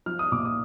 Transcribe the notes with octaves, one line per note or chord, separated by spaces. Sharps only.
F3 F6
D#6
A#2 D6
D#6